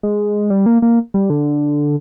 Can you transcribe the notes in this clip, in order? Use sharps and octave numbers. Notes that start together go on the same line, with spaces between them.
G#3
G3
A#3
A#3
G3
D3